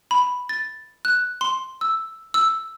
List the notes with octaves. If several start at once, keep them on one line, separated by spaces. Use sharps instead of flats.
B5
A6
F#6
C6
E6
E6